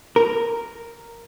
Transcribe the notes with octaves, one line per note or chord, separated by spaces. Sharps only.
A#4